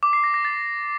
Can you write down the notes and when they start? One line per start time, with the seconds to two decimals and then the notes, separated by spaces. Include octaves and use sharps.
0.03 D6
0.13 C7
0.24 A#6
0.34 A#6
0.45 A6